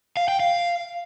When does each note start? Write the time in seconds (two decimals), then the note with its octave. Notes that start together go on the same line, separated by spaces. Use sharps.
0.17 F5
0.28 G5
0.40 F5